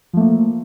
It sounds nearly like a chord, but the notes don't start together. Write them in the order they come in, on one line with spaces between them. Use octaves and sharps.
F3 A3 A#3